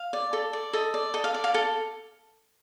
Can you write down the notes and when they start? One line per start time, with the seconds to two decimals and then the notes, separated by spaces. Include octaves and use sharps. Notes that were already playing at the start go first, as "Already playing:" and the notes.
Already playing: F5
0.13 D5
0.33 A4
0.53 D5
0.73 A4 D#5
0.94 D5
1.14 A4 D#5
1.24 F5
1.34 D5
1.44 F5
1.54 A4 F5